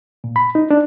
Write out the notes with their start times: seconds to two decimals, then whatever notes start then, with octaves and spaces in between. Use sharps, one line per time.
0.24 A#2
0.36 B5
0.55 D#4
0.71 D4